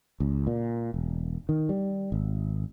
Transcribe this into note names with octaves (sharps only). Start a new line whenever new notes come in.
C#2
A#2
E1
D#3
G3
G#1